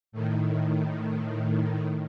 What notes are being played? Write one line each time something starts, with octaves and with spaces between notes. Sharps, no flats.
A2 D#3